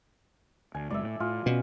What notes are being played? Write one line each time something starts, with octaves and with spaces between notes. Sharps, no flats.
D2 G#5
F#1 G#3 D5 E5
A2
A2 F4 G#5
B2 G#3 C#4